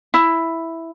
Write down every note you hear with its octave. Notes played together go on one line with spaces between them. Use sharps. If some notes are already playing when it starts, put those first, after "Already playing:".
E4